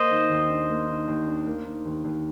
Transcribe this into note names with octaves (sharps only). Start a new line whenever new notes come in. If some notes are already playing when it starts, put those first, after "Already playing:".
Already playing: A#3 C5 D#5
D#3
D#2
D4
A#3
D#3
D#2
D4
A#3
D#3
D#2
D#2